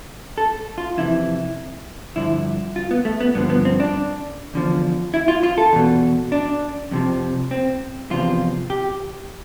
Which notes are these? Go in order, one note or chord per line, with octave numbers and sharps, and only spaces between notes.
A4
F4
F2 C3 E3 E4
G2 D3 F3 E4
F4
B3
A3
B3
G2 D3 F3 B3
B3
C4
D4
E2 D3 F3
E4
F4
F4
A4
E2 B2
D4
F2 C3 F3
C4
E2 C3 F3 F4
G4